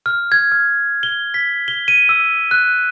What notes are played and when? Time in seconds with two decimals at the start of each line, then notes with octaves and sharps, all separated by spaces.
0.06 F6
0.32 G#6
0.52 F6
1.03 G7
1.34 B6
1.68 G7
1.88 D#7
2.09 E6
2.51 F#6